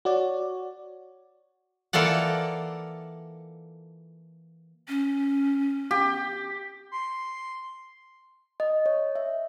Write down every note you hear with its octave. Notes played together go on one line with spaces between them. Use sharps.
F#4 C#5 D5
E3 A#3 F4 A4 D5 F#5
C#4
G4
C6
D#5
C#5
E5